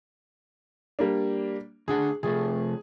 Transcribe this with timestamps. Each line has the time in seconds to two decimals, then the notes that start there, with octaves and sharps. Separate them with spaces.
0.99 G3 A#3 D4
1.88 D2 D4 G#4 F#5
2.23 C3 F3 A3 G#4